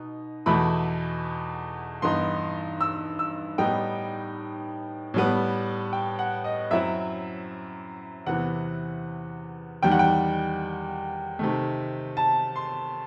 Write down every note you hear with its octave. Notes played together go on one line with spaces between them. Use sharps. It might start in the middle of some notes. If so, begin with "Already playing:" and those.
Already playing: B2 D#4
E2 B2 A3 E4 B5
G2 E3 B3 D#4 C6
E6
E6
A2 G3 B3 D#4 G5
A2 G3 B3
G5
F#5
D#5
F#2 F#3 C4 E4 E5
E2 C3 E3 B3 F#5
E2 D#3 G3 G5
F#5
G5
C3 D#3 A3
A5
C6